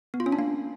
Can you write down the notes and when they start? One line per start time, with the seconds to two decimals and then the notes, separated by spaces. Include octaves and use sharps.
0.14 B3
0.20 F4
0.26 C#4
0.32 D4
0.39 A#3